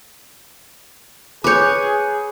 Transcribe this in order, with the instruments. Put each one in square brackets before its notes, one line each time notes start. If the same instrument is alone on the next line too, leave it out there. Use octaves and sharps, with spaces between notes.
[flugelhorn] G#4 [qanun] B4 C#5 [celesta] D6 G6